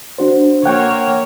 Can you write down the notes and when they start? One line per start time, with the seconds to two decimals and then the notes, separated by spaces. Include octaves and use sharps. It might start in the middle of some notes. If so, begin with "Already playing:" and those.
0.18 D4 F#4 C5
0.65 A#3 C#5 F#5 G5